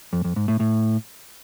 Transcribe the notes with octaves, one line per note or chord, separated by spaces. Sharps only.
F2
F2
G#2
A2
A2